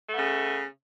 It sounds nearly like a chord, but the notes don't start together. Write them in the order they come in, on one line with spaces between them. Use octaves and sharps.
A3 B3 C#3